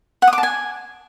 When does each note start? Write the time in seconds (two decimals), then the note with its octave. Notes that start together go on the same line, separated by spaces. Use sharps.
0.22 F#5
0.27 D#6
0.33 D6
0.38 A5
0.43 G#5